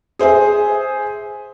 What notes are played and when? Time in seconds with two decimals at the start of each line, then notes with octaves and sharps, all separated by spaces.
0.19 G#4 C5 E5 G#5